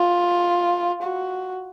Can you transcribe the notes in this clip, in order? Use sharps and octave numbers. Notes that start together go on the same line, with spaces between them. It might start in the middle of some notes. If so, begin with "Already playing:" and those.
Already playing: F4
F#4